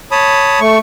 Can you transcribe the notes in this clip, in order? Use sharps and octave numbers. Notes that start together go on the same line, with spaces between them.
C#5 A5 B5 D#6
A3 C#6